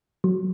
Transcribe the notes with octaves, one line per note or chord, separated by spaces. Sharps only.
F#3